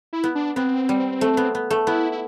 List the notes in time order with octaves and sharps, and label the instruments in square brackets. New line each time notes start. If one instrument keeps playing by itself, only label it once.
[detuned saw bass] E4
[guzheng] B3
[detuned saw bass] D4
[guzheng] B3 [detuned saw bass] C4
[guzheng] G3
A3
B3
B3
A3
[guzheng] B3 [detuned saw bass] E4
[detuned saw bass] E4